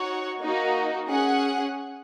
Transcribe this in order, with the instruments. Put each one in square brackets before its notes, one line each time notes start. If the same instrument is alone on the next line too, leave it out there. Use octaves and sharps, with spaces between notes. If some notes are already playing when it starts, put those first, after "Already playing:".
Already playing: [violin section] D#4 F#4 C#5 F#5
A#3 D#4 F#4
C#4 G#4 F#5